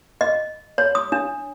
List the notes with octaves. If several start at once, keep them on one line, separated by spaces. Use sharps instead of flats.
D#5
C#5
D#6
D4